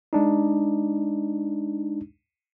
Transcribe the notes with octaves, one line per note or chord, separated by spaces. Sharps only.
G#3 D4 D#4